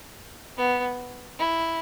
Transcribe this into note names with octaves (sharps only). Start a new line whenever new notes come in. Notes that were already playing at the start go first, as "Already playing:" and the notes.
B3
E4